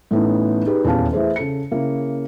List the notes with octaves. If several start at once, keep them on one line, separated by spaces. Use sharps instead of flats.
A2 E3 A3 B3 C#4 D#4
D#4 G4 G#4 B4
D#1 E2 C#4 G4 F5 A5
E3 A3 G#4 C5
C#3 A4 C#7
C#3 A#3 E4